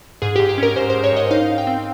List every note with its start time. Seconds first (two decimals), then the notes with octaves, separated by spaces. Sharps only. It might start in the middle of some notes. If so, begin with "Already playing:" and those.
0.22 G#2 G#4
0.36 G#2 G4
0.49 G4
0.58 C#4 A#4
0.76 G#2 C5
0.90 G#2 C5
1.04 C#5
1.13 G#2 D#5
1.31 D#4 F5
1.48 D#4
1.58 G5
1.67 C4